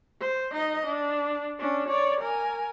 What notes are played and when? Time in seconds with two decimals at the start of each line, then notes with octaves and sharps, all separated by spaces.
0.21 C5
0.51 D#4 D#5
0.86 D4
1.59 C#4 D4
1.89 C#5 D5
2.21 A#4 G#5